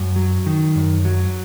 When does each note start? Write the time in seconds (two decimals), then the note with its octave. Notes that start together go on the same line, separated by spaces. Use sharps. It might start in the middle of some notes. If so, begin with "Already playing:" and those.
Already playing: F#2
0.16 F#3
0.46 D#3
0.75 F#2
1.05 F#3